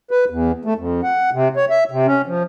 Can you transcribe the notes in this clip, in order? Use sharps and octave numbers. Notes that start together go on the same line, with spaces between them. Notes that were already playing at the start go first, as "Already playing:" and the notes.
B4
E2
A3
F2
F#5
C3
C#5
E5
C3
C#4
F3